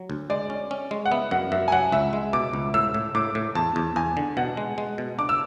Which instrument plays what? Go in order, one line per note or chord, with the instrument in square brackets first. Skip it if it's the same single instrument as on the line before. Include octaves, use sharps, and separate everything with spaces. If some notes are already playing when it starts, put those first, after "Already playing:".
Already playing: [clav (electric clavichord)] F#3
D2
[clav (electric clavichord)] G#3 [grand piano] D5
[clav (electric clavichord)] C#4
C#4
G#3
[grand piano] F#5
[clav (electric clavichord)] B3 [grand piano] E5
[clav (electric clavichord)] F#2 [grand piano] F#5
[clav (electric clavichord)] F#2 [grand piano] E5
[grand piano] G#5
[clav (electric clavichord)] F#3 [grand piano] F#5
[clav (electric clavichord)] C#2 [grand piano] E5
[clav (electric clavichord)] G#3
[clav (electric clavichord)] B2 [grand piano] D6
[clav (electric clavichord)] C#2
[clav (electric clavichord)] A2 [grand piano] E6
[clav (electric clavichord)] A2
[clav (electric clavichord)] A2 [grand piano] D6
[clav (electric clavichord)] A2
[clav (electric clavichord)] E2 [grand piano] A5
[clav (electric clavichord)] E2
[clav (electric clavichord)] E2 [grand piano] G#5
[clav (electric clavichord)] D3
[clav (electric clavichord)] B2 [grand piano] F#5
[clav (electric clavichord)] G#3
G#3
B2
[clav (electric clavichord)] D4 [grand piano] D6
[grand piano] E6